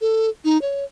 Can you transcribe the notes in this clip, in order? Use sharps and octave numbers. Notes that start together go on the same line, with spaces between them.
A4
D#4
C#5